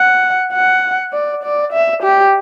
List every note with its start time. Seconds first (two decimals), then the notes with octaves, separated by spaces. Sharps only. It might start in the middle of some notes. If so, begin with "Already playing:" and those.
Already playing: F#5
0.53 F#5
1.13 D5
1.43 D5
1.73 E5
2.03 G4